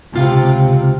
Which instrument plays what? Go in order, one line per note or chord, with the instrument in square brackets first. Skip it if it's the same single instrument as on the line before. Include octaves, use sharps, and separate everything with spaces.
[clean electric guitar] C#2 F4 F5 [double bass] C3